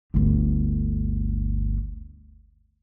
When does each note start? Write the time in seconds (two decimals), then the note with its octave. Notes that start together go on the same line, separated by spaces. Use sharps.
0.14 G1 D2